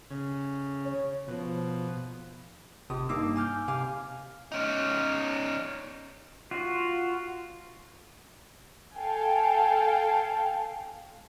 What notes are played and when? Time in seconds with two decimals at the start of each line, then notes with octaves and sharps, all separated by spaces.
0.10 C#3
0.85 C#5
1.28 B2 F3
2.90 G1 C3 D#6
3.09 G2 A#3 D#4 D6 E6
3.36 G#5 D6 F6 G6
3.68 C3 F5 G#5 D6 F6
4.52 C#4 D#4
6.51 F4 F#4
8.96 A4 F5 G5 G#5